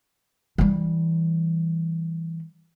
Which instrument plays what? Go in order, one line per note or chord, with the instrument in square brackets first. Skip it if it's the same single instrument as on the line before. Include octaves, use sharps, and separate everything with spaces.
[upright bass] E3 G3